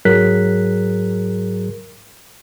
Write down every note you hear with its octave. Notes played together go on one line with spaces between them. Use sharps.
G#2 F#3 G#4 A#4 F#6 B6